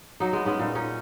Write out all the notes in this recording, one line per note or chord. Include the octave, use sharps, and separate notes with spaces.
F#3 D#4
G#3 B3
G#3 B3 C#4 D#4
A#2 D#4
C#4 D#4